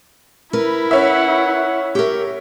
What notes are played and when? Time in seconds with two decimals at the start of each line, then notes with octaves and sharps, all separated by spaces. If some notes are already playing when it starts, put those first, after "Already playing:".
0.53 E4 A#4 B4
0.91 C#4 E5 F#5
1.95 G4 A#4